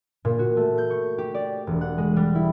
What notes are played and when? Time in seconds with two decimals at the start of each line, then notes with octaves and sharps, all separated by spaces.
0.25 A#2
0.39 F#4
0.57 A3
0.78 G6
0.90 C#6
1.18 G4
1.34 D5
1.67 E1
1.81 F#5
1.98 G#3
2.16 G3
2.35 E4